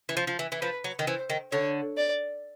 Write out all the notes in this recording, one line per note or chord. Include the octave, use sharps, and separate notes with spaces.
E3
F3
F3
E3
E3
F3 B4
F#3
D#3
E3 C5
D#3
D3 C#5
D5